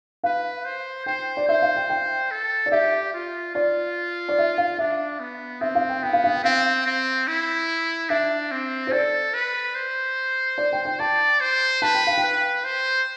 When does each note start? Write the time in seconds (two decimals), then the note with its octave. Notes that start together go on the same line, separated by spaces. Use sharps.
0.24 B4 F5
0.65 C5
1.06 C5 G5
1.37 D5
1.49 C5 E5
1.62 F5
1.76 G5
1.90 G5
2.31 A4
2.66 D5
2.72 G4 E5
3.14 F4
3.55 F4 D5
4.29 D5
4.38 E5
4.58 F5
4.78 D4 E5
5.20 B3
5.61 C4 E5
5.75 F5
5.89 G5
6.03 B3 G5
6.13 F5
6.24 F5
6.35 G5
6.45 C4 F5
6.86 C4
7.28 E4
8.10 D4 E5
8.51 C4
8.87 C5
8.92 A4 D5
9.34 B4
9.75 C5
10.58 D5
10.73 G5
10.85 G5
11.00 D5 A5
11.41 C5
11.82 B4 A5
11.94 G5
12.07 F5
12.18 G5
12.24 B4
12.64 C5